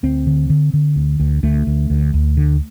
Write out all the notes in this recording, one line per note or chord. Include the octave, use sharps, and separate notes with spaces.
D2 C4
D3
D3
D3
D2
D2
D2 A3
D2
D2
D2
D3